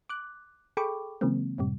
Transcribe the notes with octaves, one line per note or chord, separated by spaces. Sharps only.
D6 F#6
G#4 A4 G5 B5 C#6 D6
C#3 E3 F#3 G#3 A#3 C4
F#2 A2 C3 G3